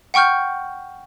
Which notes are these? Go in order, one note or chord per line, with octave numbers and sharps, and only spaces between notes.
F#5 G5 C#6 F6 G6